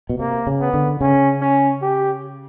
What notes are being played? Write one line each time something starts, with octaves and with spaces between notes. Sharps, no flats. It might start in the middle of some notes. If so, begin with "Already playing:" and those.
B2
C3 A#3
C#3
B3
D3
C#3 C#4
C#4
G4